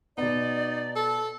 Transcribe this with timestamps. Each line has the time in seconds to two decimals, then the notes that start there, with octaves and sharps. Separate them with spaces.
0.18 B2 B3 D#4 D5
0.96 A4